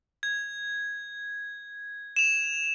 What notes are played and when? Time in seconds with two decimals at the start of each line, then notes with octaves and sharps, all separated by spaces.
0.23 G#6
2.16 E7 F7